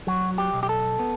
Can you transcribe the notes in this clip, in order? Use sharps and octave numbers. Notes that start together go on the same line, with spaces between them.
F#3 F#4
G4
B1
G4
A4
B3